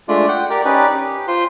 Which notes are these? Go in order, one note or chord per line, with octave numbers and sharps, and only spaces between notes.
G#3 A3 D4 F4 D5
F#5 G5
G4 A#4 D5
C#4 D#4 G4 B4 D5
G4
F4 C5 C6